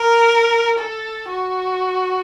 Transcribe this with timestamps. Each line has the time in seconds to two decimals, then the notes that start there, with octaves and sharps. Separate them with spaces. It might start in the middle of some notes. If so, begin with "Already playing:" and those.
Already playing: A#4
0.79 A4
1.29 F#4